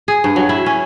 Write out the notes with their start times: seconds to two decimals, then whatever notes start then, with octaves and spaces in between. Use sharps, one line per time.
0.08 G#4
0.24 G2
0.36 F#3
0.49 E4
0.66 C#4